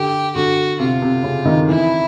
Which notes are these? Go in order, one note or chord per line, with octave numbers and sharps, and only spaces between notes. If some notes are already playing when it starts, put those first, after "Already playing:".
Already playing: D3 G4
D3 F#4
C3 F4
C3
C#3
D#3
E3 E4